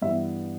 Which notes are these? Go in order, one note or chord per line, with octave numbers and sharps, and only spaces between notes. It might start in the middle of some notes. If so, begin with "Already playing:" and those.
G2 E3 G3 B3 E5